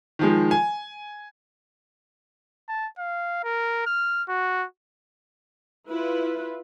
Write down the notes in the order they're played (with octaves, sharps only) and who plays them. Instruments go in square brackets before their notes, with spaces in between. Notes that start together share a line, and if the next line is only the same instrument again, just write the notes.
[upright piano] D#3 F3 G#3
G#5
[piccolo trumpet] A5
F5
A#4
F6
F#4
[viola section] E4 F4 B4